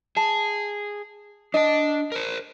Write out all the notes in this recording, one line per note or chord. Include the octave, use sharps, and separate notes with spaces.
G#4 A5
D4 D#5 A5
A#4 C5